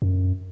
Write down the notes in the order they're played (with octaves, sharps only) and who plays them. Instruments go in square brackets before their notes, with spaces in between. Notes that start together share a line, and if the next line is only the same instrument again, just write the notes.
[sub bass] F#2